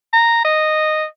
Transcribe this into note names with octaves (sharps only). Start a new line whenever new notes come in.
A#5
D#5